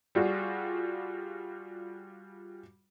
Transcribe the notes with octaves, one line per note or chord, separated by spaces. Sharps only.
G3 F4 F#4 G#4